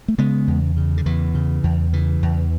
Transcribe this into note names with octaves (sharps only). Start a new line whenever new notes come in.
A3
C#3 G#3 B3
E2
C#3
D3
E2 E3
C#3
E2
C#3 E3
E2